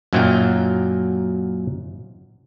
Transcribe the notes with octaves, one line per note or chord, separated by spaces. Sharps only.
F#2 A#2 F#3 A#3 D#4 G5